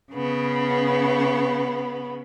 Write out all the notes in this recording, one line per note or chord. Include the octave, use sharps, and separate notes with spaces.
C#3 B3